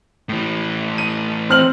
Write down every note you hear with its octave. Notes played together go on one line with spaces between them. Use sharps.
A2 E3
D#7
C4 F6 F#7